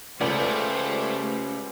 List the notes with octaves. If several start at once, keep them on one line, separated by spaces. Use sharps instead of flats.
C#2 A3 C#4 G4 C5 D5